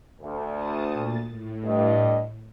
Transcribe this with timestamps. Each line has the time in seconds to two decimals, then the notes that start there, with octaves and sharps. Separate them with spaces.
0.22 D2
0.50 A5 D#6
0.93 A#2 A6
1.29 A2
1.65 G2 D#5